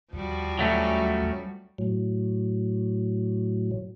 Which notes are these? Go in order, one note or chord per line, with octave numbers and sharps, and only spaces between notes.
D#2 F3 G3 F#4
F#3 A3 C#4
A2 F#3